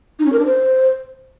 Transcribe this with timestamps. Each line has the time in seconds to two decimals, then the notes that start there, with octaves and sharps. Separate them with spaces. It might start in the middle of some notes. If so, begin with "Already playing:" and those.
0.19 D#4
0.26 C#4
0.33 A#4
0.39 D4
0.46 C5